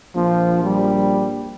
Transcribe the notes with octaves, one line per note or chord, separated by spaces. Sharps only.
A#1 F3
G3